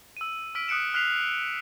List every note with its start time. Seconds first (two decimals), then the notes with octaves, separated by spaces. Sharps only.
0.17 E6 D#7
0.55 E6 F6 B6 D7
0.68 D#6 F#6 C#7 D7 E7
0.94 F6 F#6 B6 C7 F7